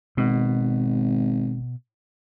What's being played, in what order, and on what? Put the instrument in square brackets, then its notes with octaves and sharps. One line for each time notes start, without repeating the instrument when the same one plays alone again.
[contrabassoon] G#1 [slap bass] B2